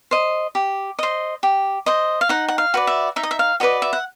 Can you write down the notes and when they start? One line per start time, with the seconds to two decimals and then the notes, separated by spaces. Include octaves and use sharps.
0.11 C5 D#5
0.55 G4
0.99 C5 D#5
1.43 G4
1.86 C5 D#5
2.21 F5
2.29 D#4 F#5
2.48 F#5
2.58 F5
2.74 F#4 B4 D5
2.87 E5
3.16 D#4 E5
3.23 D#5
3.31 E5
3.39 F5
3.60 F#4 B4 D5 D#5
3.82 E5
3.93 F#5